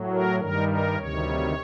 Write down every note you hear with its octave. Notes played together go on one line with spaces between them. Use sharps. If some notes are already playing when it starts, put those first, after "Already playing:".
Already playing: A2 F#3
A#4
G2 D#3 G3 A#4
A#4
D2 C3 D#3 G3 C#5